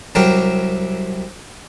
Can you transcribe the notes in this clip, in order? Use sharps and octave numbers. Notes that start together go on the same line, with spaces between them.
C2 C3 F#3 C4 G4 A#4